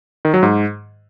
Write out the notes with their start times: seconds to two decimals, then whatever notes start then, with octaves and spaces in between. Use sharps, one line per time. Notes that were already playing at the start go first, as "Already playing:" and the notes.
0.25 D#3
0.34 F#3
0.43 G#2